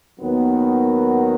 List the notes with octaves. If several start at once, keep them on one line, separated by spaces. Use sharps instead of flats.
D#2 D#3 F#3 B3